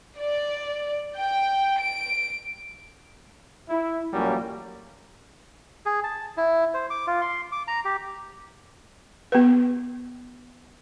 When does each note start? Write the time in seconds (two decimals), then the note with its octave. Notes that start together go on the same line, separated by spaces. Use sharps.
0.18 D5
1.16 G5
1.79 D7
3.69 E4
4.13 A1 A#2 F#3 G3 A#3 C#4
5.86 G#4
6.04 A5
6.37 E4
6.74 C5
6.90 D6
7.07 F4
7.21 C6
7.52 D6
7.68 A#5
7.85 G4
9.32 B3 B4